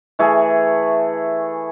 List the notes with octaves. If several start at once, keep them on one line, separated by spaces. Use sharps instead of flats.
E3 A3 G#4